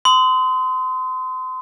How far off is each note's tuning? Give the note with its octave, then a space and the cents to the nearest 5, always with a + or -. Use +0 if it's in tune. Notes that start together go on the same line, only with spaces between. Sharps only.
C6 -30 D#6 +25